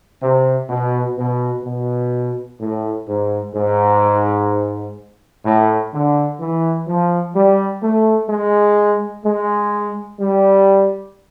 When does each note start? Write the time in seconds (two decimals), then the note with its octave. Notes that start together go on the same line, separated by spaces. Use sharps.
0.21 C3
0.69 B2
1.16 B2
1.63 B2
2.59 A2
3.06 G#2
3.53 G#2
5.43 A2
5.92 D3
6.39 E3
6.86 F3
7.34 G3
7.81 A3
8.29 G#3
9.24 G#3
10.19 G3